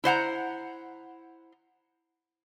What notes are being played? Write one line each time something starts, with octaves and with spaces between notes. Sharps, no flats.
E4 C5 F#5 A#5